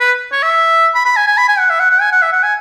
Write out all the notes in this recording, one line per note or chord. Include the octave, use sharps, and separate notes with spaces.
B4
C#5
E5
B5
B5
G#5
G#5
B5
G#5
F#5
E5
F#5
F#5
G#5
F#5
E5
F#5
G#5